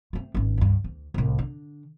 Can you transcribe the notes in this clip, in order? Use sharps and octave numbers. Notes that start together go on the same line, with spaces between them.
A3 C4
G#1 C#4
C#2 G2
D2
C2 A2
D3